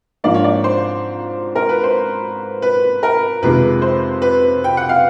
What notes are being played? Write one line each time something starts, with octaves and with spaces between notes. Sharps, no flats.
G#2 F3 A#3 D4 D5
C#5
D5
C5
A#4
B4
C5
B4
A#4
F2 C3 D#3 G#3 B4
C5
B4
G5
F#5
F5